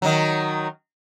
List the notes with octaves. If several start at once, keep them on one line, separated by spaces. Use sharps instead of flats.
D#3 F#3